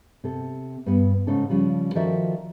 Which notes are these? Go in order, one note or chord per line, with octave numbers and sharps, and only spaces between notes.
C3 A4
G2 B3
G#2 C#3 C#4 D#4 A4
C#3 F3 G3
D#3 F3 F#4 A4 D5 E5